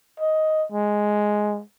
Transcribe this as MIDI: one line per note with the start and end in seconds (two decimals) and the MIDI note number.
0.20 0.65 75
0.72 1.62 56